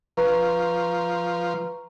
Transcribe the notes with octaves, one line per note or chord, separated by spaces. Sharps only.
F3 B4 A#5 C#6